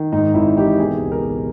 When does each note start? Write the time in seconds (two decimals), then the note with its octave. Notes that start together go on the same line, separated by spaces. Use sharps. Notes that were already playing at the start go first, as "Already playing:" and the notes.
Already playing: D#3
0.12 G#2 D#4
0.34 G#1 E4
0.56 E3 G4
0.79 B2 G#4
1.01 C#2
1.12 A#4
1.23 B2